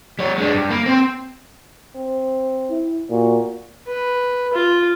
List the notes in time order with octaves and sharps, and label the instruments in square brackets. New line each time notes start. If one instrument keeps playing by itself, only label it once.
[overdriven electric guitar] G3 C#5
G#3 D4
G2
A#3
C4 C5
[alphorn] C4
[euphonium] E4
[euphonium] A#2 [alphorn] F#4
[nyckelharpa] B4
F4